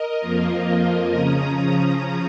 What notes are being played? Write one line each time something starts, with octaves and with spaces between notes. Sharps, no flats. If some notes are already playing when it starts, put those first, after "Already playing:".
Already playing: A#4 D#5
F2 F3 A#3 F4
C#3 F3 C#4 A#5 D#6